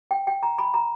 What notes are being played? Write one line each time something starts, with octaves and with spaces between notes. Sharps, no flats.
G5
G5
A#5
B5
A#5